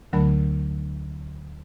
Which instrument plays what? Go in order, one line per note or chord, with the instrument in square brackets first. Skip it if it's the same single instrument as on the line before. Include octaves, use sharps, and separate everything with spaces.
[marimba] D2 D3 F#3 A3 A#4 B5